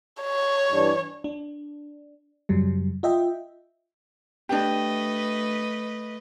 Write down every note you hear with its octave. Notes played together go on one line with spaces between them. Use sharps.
C#5
G2 E3 D4
D4
F#2 C#3 F#3 G3
F4 D#5 E5 G5
A3 D4 G4 B4 D#5